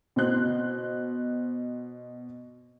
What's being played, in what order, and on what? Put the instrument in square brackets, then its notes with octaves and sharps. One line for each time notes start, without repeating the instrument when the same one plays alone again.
[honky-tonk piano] B2 C5 F#6